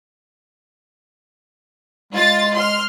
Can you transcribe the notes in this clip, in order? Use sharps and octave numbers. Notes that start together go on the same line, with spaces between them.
G#3 F4 A6
C6 F6